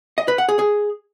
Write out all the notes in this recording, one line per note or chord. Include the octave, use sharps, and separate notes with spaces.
D#5
B4
F#5
G#4
G#4